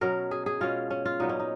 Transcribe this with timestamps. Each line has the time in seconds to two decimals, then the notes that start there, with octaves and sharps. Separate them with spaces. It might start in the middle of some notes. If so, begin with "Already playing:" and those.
0.01 B2 F#3 C#4 A#4
0.31 G#4
0.46 G#4
0.61 B2 G#3 C#4 F4
0.90 C#4
1.06 F4
1.20 A#2 F#3 B3 D#4
1.29 C#4
1.39 D#4